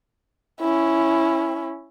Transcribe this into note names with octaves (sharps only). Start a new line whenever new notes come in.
C#4 E4